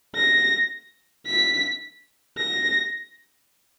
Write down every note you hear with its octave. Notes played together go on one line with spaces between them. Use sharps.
A#6
B6
A#6